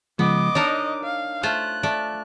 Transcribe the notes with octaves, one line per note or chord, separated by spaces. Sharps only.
C#3 F3 G#3 B3 D#5 D6
D4 D#4 A#4 C#5
F5
A3 F4 C5 F#6
A3 D5